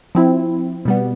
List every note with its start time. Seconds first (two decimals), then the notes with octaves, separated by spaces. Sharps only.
0.15 F3 C4 E4
0.85 B2 G3 B3